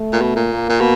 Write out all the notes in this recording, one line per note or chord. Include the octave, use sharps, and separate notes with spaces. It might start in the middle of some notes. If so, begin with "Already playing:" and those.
Already playing: A3
A#2
B2
A#2
A#3
A#2
B2